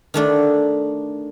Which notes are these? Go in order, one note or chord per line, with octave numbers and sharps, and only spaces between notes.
D#3 A3 D4